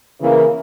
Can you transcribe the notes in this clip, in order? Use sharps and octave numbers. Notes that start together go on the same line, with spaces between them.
C#3 E3 A#3